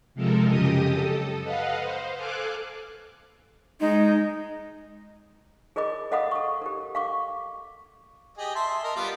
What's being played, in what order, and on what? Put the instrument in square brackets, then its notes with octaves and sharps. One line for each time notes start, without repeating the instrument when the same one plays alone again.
[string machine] C3 F3 G#3 A4 A#4
F#2 C#3 G4 D#5 D#6
A4
B4 D#5 F5 F#5
C5
A4 F5 G#5 D6 F#6
[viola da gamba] G#3 [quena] D#4
[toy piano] G#4 A#4 D#5 B5 D6
A4 D#5 F5 F#5 B5 D#6
A4 C#6
G4 A#4
F5 C#6 D6
[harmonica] G4 G#4 D#5
E5 A5 C6
A#4 D#5
G3 B3 F4